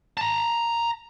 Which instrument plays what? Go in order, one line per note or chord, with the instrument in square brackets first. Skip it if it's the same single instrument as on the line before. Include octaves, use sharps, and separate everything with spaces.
[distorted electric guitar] A5 A#5